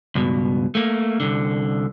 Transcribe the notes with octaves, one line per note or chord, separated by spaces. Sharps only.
C#2 G2 B2
A3 A#3
C2 D3